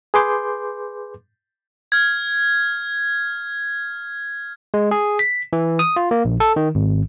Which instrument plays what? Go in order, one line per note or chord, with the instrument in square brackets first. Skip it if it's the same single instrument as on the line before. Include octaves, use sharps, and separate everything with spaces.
[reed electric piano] G#4 B4 C6 D6 G6
[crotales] F6 G#6
[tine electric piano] G#3
G#4
B6
E3
D#6
F4
A#3
A#1
A4
D#3
G#1